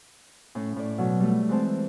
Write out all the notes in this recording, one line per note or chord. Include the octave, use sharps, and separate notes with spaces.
A2 C#4
A2 D5
B2 F#3
G3 A3
E3 G#3 C4 A5